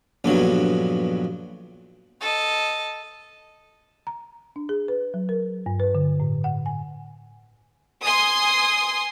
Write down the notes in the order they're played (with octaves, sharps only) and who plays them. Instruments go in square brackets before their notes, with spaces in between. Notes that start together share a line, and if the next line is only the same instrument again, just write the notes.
[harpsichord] A#1 G2 B2 D3 F#3
[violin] A4 D#5
[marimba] A#5
D4
G#4
B4
F#3
A#4
G2
B4
D3
A2
F#5
G#5
[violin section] G#5 C6 D#6